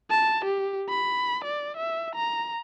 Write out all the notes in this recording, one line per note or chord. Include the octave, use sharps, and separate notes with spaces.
A5
G4
B5
D5
E5
A#5